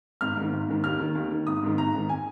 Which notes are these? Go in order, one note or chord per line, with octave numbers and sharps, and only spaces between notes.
G#1 F6
G#2 D#3
G#1
G#2 D#3
D#2 F6
D#3
D#2
D#3
G#1 D#6
G#2 D#3
G#1 A#5
G#2 D#3
G#5